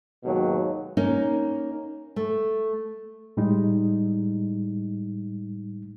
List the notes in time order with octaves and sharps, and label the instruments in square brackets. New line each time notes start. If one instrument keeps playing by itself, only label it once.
[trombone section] D#2 G#2 B2 F#3
[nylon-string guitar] A#3 C#4 D#4 A#4
A3
[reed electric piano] A2 G3 G#3 D#4